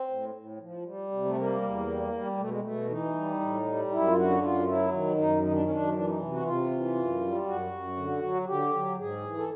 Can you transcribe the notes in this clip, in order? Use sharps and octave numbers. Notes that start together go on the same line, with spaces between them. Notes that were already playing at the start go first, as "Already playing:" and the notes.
Already playing: C4
A2
A2
F3
G3
C3
A3
G3 A#3
E2
G3
G3
B2 A3
G#3
B2 A3
E3 D#4
G3
A2
G3
F#2 E4
F4
D3 F#4
F#2 F4
F#3 E4
D#3
F#2 D#4
D#3 D#4
D4
C#4
F#2 D4
C#4
E3 D4
D#4
C3
F#4
C3 F4
E3
F#2
G3
F#2 F#4
F#2
D3
F#3
D3 G4
F#3
G#2 G#4
E3
A4